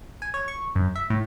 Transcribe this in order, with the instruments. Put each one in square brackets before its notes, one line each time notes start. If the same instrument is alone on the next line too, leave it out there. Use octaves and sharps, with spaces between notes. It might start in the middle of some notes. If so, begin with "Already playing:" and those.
[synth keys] G#5
C#5
C#6
F#2
E5
A2